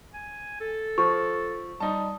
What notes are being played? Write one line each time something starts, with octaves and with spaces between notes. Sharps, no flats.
G#5
A4
F3 C#6
G3 D#4 A5